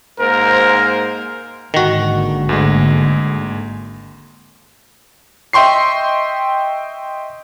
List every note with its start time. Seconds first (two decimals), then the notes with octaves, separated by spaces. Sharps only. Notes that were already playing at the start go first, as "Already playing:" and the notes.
0.20 G#2 A#3 A#4 C5
1.74 G#1 D3 D#3 A#3 F#4
2.49 D2 G#3
5.53 D#5 E5 G5 C6 C#6 C7